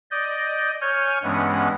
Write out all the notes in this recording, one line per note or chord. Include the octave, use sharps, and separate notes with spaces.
D5 D#5 G6
C#5 G#5 F6 G6
G2 E3 G#3 B3 C#4 F#5